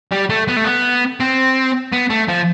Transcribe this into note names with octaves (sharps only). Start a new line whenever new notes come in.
G3
A3
B3
A3
B3
C4
B3
A3
F3